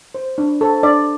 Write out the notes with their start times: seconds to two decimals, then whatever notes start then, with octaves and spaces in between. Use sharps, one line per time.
0.15 C5
0.38 D4
0.61 A4 C5
0.83 D4 D5